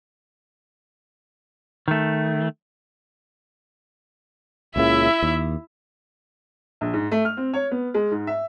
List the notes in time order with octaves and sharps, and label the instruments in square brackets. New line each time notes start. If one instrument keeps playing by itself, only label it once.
[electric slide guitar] D#3 A3
[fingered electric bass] C#2 A#2 C#3 [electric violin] E4 E5
[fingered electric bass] D#2
[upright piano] A#1
G#2
A3
F6
C4
C#5
B3
G#3
G#2
E5